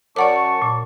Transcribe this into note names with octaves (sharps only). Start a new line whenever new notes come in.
F#2 D5 F#5 A5 C#6 D6
A#2